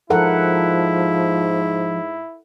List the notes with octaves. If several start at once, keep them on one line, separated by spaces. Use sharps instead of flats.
G#2 F3 E4 A4 A#4 F#5